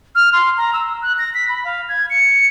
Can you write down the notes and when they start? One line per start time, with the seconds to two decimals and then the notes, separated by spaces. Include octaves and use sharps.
0.15 F6
0.33 C6
0.57 A#5
0.73 E6
1.02 F#6
1.18 A#6
1.34 B6
1.49 B5
1.65 F5
1.89 G#6
2.10 C#7